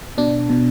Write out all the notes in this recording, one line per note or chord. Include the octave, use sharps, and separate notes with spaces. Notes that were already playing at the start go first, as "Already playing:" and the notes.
B2 D4
B2